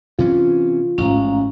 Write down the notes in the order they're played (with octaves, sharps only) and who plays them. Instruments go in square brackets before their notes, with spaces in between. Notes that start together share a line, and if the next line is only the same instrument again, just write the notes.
[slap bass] C3 E3 C#4 [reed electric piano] F4
[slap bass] A1 G#2 [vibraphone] C#4 F5 A#5